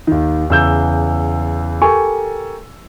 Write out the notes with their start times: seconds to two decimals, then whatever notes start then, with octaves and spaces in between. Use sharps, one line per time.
0.07 D#2 D#3
0.50 E2 C#3 E6 G6
1.82 G4 A4 A#4 G#5 C#6